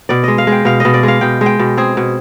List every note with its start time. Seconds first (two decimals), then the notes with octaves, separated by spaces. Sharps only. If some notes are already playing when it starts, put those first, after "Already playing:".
0.09 B2 D5
0.24 G#3 D#5
0.38 F5
0.47 G#3
0.52 G5
0.65 B2 F5
0.80 D#5
0.85 B2
0.94 D5
1.03 G#3 F5
1.21 B2 G5
1.41 G#3
1.46 G5
1.59 B2
1.77 C4 G#4
1.97 B2